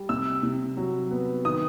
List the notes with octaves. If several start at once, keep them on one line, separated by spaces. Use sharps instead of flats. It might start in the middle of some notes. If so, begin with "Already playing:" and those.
Already playing: G3
C3 E6
C3
F#3
B3
D#3 D#6